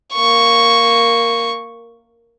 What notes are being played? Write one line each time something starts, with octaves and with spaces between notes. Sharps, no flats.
A#3 C#6